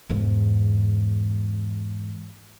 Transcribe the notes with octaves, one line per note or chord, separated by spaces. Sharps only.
E2 G#2